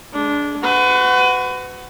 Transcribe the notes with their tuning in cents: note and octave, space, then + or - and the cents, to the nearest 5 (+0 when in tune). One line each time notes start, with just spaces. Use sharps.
G#3 +20 D4 -15
F#4 +0 B4 +35